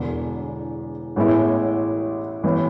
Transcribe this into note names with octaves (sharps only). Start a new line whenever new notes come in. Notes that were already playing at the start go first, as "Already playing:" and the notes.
Already playing: E1 E2 D3
A1 A2 G#3 B3 E4
A1 A2 E3 B3